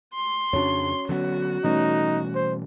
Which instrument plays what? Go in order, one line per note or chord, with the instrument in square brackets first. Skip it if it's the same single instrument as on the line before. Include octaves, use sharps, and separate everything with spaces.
[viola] C6
[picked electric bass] F2 C#3 D4 [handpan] C#4 F#4 C#5
[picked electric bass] D3 F#3 B3 [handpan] C#4 [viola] F#4
[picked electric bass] B2 E3 G3 [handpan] A3 C#4 [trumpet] D#4
[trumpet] C5